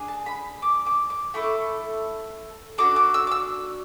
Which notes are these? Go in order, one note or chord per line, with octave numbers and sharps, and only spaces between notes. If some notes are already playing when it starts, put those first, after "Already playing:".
Already playing: D4 G#4
A5
B5
D6
D6
D6
A3 E4 A4 C#6
D4 F#4 A4 D6
D6
E6
D6
E6